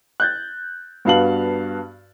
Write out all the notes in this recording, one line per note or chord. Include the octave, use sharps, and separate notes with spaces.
F#6 G6 A6
G2 B3 F#4 F5 A5 F#7